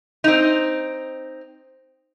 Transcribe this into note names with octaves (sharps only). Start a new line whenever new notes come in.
C4 D#4